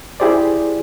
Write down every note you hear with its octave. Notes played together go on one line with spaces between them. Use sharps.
E4 G4 G#4 C5 D5